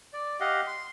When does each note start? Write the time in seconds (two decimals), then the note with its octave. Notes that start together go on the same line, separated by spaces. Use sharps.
0.13 D5
0.40 G4 D#5 F5 F#5
0.67 C6